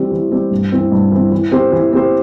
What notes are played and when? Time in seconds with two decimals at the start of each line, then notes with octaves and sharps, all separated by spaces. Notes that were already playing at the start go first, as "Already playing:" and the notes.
Already playing: E3 G3 C4 G4
0.12 E3
0.31 G3 C4 G4
0.51 G2
0.72 E3 C4
0.92 G2
1.12 E3 C4
1.32 E3
1.52 C4 G4 C5
1.72 E3
1.93 C4 G4 C5